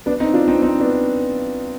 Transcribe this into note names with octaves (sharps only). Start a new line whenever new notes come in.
B3 D4
C4 D#4
D4 F4
C4 D#4
C4 D#4
B3 D4